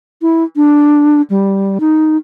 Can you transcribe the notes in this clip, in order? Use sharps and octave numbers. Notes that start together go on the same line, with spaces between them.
E4
D4
G3
D#4